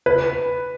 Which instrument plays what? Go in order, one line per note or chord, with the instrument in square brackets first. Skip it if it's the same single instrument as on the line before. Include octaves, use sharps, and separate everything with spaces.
[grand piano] B4